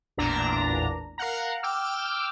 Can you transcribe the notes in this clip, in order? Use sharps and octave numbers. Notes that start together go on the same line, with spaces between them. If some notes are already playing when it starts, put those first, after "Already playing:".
A1 E2 A#2 D4 A#5
A#4 F5 F#5 A#5
G5 D6 E6 F6